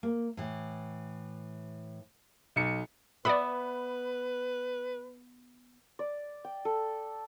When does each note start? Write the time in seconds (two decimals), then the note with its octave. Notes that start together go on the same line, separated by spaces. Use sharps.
0.03 A#3
0.37 A2 E3
2.56 B1 C#7
3.25 B3 B4 D5 E5 F#5 B5
5.99 D5
6.44 G5
6.65 A4